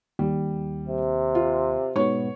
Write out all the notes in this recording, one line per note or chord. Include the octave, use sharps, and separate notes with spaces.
D#2 G3
C3
F4
G#2 B2 B3 C#5 C#6